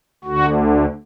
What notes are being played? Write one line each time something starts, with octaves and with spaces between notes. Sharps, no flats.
D2 D3 F#4